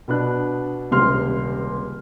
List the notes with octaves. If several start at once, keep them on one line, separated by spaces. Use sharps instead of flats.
B2 B3 D4 F#6
D#1 C#2 C3 C6 F6